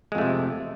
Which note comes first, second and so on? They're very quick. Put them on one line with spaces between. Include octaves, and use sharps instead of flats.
G#3 F2 A3 C3